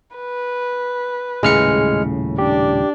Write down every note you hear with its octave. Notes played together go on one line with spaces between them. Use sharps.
B4
D#1 A2 C#3 G#3 F6 C#7
D4 G4